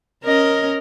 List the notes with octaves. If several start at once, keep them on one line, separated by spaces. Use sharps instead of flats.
C#4 A#4 D#5